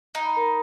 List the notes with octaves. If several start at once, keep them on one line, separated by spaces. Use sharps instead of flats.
D#4 A#5
B5
A#4 A#5